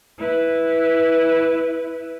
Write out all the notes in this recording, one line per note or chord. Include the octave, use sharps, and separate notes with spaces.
E4 B4